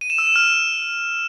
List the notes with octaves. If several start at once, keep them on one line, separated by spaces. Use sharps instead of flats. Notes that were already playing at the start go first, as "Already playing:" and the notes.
D#7
E7
E6
E7
F6